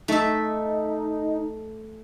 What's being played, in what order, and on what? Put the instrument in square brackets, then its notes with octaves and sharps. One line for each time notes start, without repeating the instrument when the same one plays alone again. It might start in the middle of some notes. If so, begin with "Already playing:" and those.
[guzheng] A3 E5 [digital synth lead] D#4